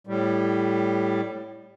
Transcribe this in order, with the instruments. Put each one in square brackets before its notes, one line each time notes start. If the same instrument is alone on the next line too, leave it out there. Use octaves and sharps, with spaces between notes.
[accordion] A2 G3